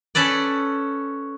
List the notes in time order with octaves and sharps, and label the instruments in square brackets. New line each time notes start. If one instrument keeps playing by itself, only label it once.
[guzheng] C#4 A4 B4 D5